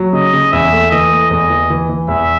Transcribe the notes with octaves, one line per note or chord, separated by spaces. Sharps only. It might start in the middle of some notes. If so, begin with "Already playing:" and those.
Already playing: F#3
C#3 D#5
C#3
E2 E5
A3
E3 D#5
A3
E2 D#5
E3
E3
E3
E2 E5